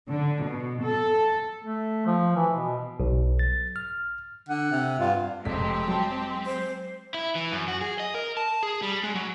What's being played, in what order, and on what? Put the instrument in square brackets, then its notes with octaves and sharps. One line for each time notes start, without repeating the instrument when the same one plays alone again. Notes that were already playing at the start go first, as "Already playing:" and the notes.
[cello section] D3
B2
A4
[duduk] A3
F3
E3
B2
[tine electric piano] B1
A6
F6
[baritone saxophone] D3 [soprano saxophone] F#5
[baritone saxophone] C3
[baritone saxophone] G2 [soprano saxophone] F4
[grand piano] F1 B6 [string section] G#3 C4 G4
[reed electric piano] F#3 [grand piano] G5 A5 C6
[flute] C5
[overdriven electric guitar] E4
E3
F#2
F#4
G#4
D#5
A#4
A5
G#4
G3
G#3
F#3